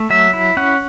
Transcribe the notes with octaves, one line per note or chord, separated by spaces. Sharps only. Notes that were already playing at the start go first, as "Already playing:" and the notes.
Already playing: A3
F#3 E5
E4
C#4 F#5